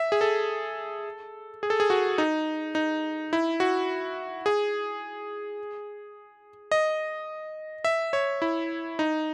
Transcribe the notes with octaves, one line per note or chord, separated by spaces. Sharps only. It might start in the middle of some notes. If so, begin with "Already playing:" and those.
Already playing: E5
G#4
A4
G#4
A4
G#4
F#4
D#4
D#4
E4
F#4
G#4
D#5
E5
C#5
E4
D#4